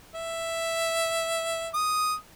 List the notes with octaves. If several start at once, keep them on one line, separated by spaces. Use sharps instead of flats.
E5
D#6